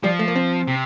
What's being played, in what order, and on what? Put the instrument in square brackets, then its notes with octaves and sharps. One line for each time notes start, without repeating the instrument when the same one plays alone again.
[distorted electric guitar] F3 [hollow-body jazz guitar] G3
[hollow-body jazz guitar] A3
A#3
C4
[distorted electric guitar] C3